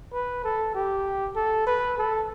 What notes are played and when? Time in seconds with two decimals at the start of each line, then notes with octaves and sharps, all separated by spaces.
0.13 B4
0.44 A4
0.75 G4
1.36 A4
1.67 B4
1.98 A4